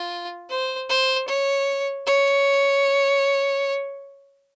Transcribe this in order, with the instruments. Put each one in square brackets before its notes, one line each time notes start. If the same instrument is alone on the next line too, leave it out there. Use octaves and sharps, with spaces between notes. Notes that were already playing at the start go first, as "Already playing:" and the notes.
Already playing: [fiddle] F4
C5
C5
C#5
C#5